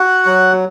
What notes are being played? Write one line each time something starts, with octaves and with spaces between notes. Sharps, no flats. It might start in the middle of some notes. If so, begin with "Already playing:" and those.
Already playing: F#4 F#5
F#3